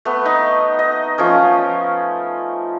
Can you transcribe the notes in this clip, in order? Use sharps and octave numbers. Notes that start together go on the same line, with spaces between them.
A3 B3
D#4
D#5
F3 A3 C#4